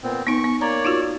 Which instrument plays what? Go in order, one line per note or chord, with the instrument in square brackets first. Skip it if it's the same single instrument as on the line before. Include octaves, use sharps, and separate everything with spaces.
[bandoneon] A#2 B3 C4
[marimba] B3 D#4 [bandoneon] C#6
[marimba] B3
[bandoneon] A#3 C#5 D5 [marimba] A#5
[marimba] D#4 F4 F#4